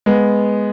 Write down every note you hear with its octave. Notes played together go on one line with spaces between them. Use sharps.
G#3 B3